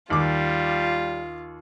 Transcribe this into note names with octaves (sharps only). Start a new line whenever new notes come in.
D#2 G3 F4 D6